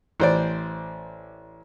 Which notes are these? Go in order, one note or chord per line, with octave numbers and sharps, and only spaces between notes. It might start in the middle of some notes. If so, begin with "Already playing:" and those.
A1 C5 D5